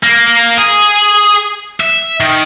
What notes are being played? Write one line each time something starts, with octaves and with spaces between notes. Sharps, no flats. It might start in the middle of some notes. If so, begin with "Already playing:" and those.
A#3
G#4
E5
D#3